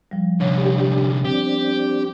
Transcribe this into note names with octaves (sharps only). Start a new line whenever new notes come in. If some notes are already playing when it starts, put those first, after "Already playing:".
F3 G3
C2 D3 C#5
G3 D4 G4
C4 D4 G4